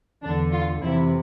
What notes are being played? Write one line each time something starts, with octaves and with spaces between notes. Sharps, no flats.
E2 D3 D4
F4
F2 C3 E3 E4